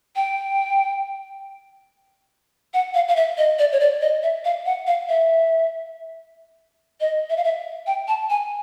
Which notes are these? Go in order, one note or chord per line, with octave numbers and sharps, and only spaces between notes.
G5
F#5
F5
F5
E5
D#5
D5
C#5
D5
D#5
E5
F5
F#5
F5
E5
D#5
E5
F5
E5
G5
A5
G#5